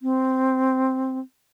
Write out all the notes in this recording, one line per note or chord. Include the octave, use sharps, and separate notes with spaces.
C4